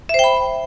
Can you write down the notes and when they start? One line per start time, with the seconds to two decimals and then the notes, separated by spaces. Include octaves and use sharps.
0.09 E5
0.14 C5
0.19 G5
0.24 B5